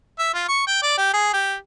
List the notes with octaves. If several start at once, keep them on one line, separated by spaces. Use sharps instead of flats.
E5
F4
C#6
G5
D5
G4
G#4
G4